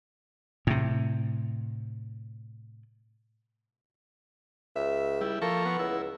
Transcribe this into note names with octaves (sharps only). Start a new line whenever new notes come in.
A2 C3
C#2 E5
G3 E4
F3 A#3 A4 A#4 C#6
B3
C#2 E4